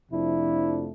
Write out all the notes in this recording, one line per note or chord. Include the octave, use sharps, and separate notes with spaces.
F2 C3 F3 A3 D4 E4